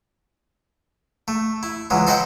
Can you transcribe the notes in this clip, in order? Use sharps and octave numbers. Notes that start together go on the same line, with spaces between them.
A3
E4
C#2 E3 F#3 G#3
A4 C5 D#5 E5 F#5 G5